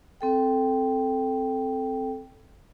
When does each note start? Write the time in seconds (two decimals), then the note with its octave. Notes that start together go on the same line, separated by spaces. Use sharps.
0.21 C4 A4 G5